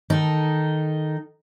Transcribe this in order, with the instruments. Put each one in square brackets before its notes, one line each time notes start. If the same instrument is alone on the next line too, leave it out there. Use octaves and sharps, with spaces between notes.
[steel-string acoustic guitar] D#3 D#4 A4